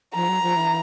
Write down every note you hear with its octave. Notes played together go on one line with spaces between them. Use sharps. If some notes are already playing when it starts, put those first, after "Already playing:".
F3 A#5
F#3
F3
E3